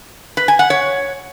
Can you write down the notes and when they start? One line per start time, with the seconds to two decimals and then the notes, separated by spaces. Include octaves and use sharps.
0.37 B4
0.48 G#5
0.59 F#5
0.70 C#5